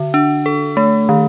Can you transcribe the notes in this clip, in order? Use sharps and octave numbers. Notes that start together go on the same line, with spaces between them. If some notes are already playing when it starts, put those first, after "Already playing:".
Already playing: D3
D4
A4
A3
D#3